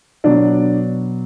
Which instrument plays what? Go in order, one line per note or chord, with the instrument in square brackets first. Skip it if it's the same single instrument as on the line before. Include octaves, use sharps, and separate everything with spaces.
[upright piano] B2 F#3 B3 D4 D5